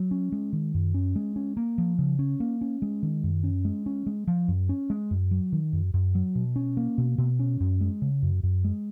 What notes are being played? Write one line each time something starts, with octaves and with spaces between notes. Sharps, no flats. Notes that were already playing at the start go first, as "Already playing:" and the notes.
Already playing: F#3
C#4
G#3
D#3
F#2
C#4
G#3
C#4
A#3
F3
C#3
C#4
A#3
C#4
G#3
D#3
F#2
C#4
G#3
C#4
G#3
F3
F#2
C#4
G#3
F#2
F#3
D#3
F#2
F#2
F#3
B2
C#4
A#3
B2
B2
C#4
F#2
G#3
C#3
F#2
F#2
G#3